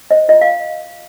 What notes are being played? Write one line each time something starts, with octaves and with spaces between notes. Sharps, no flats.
C5 D#5
F4 D#5
F5